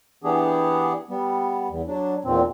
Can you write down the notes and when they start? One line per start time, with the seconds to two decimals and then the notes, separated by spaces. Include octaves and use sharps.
0.24 E3 B3 D4 G4 G#4
1.10 G3 B3
1.69 E2
1.87 F#3 D4
2.25 E2 A#2 D#3 C4